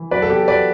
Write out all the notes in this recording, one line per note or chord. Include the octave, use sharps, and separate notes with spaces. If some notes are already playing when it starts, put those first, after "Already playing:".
Already playing: E3
F#3 B4 D5
A4
B3 G4
F#3 B4 D5